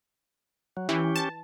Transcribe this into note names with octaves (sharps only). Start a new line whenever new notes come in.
F#3
E3 C#4 G4
A5